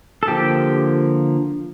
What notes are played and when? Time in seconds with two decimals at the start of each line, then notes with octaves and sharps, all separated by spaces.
0.23 A4
0.27 D3 F3 A#3 G4